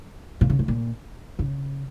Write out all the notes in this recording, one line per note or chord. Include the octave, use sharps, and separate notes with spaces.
A#2
C#3
A2
A#2
C#3